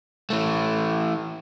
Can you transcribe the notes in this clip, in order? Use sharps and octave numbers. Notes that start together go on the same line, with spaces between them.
E3 A3